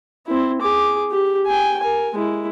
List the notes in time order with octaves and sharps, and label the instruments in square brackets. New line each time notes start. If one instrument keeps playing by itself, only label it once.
[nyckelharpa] C4 E4
G#4 D6
G4
G5 G#5
A#4 G#5
G#3 E4